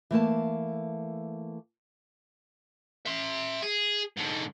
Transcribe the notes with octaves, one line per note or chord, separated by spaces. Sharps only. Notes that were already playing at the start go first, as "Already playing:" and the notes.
E3 A3 A#3 A5
E5 C6
G#4
G#2 D3